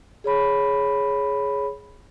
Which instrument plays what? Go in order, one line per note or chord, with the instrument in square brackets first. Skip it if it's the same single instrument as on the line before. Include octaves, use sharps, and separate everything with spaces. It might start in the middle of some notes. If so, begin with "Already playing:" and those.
[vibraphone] G#4 C#5 B5